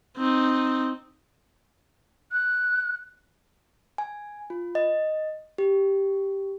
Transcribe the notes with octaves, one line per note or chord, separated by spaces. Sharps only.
C4 D#4
F#6
G#5
F4
D#5
G4